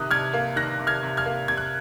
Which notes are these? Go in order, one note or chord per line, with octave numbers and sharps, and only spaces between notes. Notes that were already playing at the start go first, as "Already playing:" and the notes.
Already playing: C3 D#3 D#6 F#6
C3 F6 G#6
A#3
D#3 F#6 A#6
C3
F6 G#6
C3
F6 G#6
A#3
C3 G#6
F#6